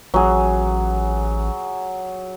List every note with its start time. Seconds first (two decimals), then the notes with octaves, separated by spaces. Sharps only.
0.14 A1 F#3 G#4